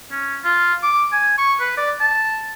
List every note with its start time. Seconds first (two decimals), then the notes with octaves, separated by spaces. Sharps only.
0.11 C#4
0.44 F4
0.83 D6
1.12 G#5
1.38 C#6
1.60 B4
1.77 D5
2.00 A5